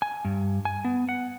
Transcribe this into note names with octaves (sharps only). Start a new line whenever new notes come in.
G#5
G2
G#5
B3
F#5